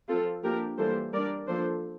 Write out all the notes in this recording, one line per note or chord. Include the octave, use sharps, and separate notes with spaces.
F3 C4 F4 A4
F3 A#3 D4 G4 A#4
E3 G3 A#3 A4 C5
G3 D4 A#4 D5
F3 A#3 D4 A4 C5